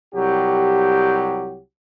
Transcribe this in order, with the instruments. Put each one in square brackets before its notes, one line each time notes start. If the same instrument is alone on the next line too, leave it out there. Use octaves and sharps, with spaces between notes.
[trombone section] C2 F#3 G4